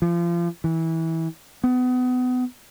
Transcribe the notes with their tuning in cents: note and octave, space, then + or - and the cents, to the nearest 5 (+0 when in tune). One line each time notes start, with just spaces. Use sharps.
F3 -30
E3 -20
B3 +30